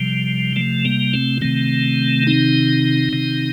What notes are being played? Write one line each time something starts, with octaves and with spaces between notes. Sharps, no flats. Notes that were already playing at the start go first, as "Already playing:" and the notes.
Already playing: C3 F3 G3
F3 A3
G3 A#3
A3 C4
C3 D#3 A3 C4
C4 D#4
C3 D#3